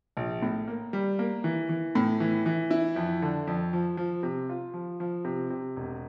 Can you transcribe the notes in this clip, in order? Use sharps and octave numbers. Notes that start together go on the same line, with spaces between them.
A#1
A2
A#3
G3
A#3
E3
E3
A2
E3
E3
E4
F2
D3
F2
F3
F3
C3
F4
F3
F3
C3
C3
E1